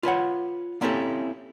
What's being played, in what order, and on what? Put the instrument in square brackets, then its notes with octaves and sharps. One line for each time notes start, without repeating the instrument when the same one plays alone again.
[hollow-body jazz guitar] F4 B4 C#5 F#5
A#3 C4 C#4 E4 G4 A4